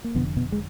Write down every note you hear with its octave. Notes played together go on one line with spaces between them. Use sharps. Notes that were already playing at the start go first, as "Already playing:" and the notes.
A#3
F1 F2 B2 D3 B3
B2 B3
G#3